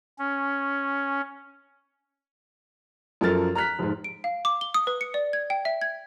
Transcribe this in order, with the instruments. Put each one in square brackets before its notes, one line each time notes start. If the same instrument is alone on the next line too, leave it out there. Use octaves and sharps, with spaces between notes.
[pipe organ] C#4
[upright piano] F#2 F3 A4 A#4 F6 A6
A#5 F6 F#6 B6
F1 G#2
[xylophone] D7
F5
D6
G7
D#6
B4
C#7
D5
G#6
G5
E5
G#6